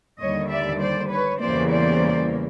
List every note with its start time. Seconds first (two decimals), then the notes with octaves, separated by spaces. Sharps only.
0.20 D#2 D3 G3 C#5 D#5
0.50 D5 E5
0.80 C5 D5
1.11 B4 C#5
1.40 E2 C#3 E3 G3 A#3 C5 D5
1.70 C5 D5